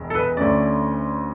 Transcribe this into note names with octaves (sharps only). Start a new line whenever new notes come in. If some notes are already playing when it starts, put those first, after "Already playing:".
Already playing: E1 E2
A4
B4
D2 D3 A3 C#4 D5